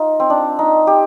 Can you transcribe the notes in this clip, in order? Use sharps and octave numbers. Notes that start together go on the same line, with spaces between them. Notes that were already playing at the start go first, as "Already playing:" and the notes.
Already playing: D#4 F4
C4
D4
D#4
G4